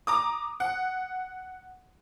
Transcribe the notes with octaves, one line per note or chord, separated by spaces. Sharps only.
A#5 D6 D#6
F#5